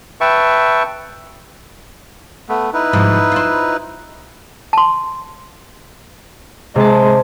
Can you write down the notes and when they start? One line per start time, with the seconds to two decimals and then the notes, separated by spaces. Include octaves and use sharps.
0.21 B4 E5 G5 A5 C#6
2.49 A3 B3
2.73 D#4 E4 B4
2.93 G#2 C3 F3
3.32 F4 C5
4.73 A5 C6
6.76 C3 G#3 A5